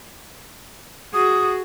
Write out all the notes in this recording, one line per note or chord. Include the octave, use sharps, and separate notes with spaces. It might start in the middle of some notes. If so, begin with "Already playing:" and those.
F#4 G#4 D#6